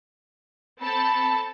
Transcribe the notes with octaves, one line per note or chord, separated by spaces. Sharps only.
C4 A4 A5 B5